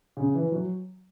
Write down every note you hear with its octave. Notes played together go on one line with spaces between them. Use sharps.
C#3
E3
F#3